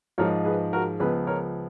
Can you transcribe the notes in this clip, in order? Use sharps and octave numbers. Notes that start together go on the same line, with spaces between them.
G#2 F3 G#3 A#4 C#5
G#4 B4
F#4 A#4
C#2 C#3 F3 B3 G#4 B4
A#4 C#5